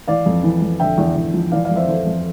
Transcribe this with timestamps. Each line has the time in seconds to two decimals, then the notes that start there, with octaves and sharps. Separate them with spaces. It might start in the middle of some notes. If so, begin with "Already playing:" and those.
0.08 E3 D5 F5
0.26 F2
0.44 E3
0.62 F2
0.80 D3 E5 G5
0.98 E2
1.16 E2
1.34 F3
1.52 E3 D5 F5
1.64 D5 F5
1.71 F2
1.76 C5 E5
1.88 E3 A4 C5
2.06 F2